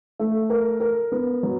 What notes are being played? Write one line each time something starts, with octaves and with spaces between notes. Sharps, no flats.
A3
A#4
A#4
B3
F#3